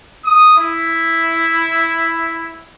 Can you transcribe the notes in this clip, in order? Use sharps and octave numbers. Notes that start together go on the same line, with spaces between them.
D#6
E4